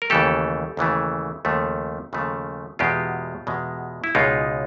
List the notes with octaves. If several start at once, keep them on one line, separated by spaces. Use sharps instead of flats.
A#4
D#2 C#3 E3 A3 G4 A4
D#2 C#3 E3 A3
D#2 C#3 F3 A3
D#2 C#3 F3 A3
E2 B2 G#3 F4 G4
E2 B2 G#3
E4
C#2 B2 G#3 D#4 F4